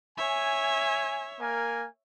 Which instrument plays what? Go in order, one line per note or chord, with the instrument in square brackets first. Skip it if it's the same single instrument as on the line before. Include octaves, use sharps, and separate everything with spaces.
[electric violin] C#5 E5 [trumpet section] G#5
[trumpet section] A#3 A#4 G#5